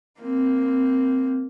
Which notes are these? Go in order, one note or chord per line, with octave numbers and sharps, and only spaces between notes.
A#3 C4